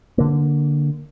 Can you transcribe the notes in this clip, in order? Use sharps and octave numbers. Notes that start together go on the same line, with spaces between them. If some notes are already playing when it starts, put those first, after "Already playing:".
D3 A#3